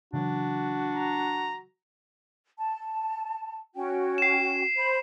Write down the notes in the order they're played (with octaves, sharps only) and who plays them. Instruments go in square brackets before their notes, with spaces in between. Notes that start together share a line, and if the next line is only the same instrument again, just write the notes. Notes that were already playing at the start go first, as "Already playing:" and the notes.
[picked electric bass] C#3 E3 F#3 [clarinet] D4 [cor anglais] F#4
[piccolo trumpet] A#5
[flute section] A5
C#4 F#4 G5
[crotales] C7 E7
[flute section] C5 B5